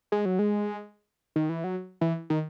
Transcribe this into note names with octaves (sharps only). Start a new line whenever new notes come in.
G#3
F#3
G#3
D#3
E3
F#3
E3
D#3